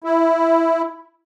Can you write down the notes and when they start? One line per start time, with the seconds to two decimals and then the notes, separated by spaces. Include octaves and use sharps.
0.04 E4